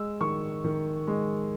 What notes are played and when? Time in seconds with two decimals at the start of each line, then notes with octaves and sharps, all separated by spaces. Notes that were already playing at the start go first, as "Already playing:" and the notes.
Already playing: G#3 E6
0.20 D#3 C#6
0.64 D#3
1.07 G#3